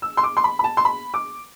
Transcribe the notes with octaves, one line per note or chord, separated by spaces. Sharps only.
E6
C6
D6
C6
B5
B5
A5
C6
B5
D6